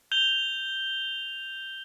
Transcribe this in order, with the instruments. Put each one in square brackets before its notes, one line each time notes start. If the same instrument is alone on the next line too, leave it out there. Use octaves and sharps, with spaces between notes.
[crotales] G6 F7 G7